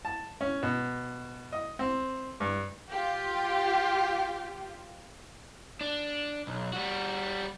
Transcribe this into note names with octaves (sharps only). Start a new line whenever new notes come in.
A5
C#4
B2
D#5
C4
G2
F4 G4
D4
B1
G3 F#4